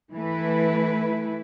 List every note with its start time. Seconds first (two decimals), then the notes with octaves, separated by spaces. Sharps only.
0.12 E3 A3 E4 B4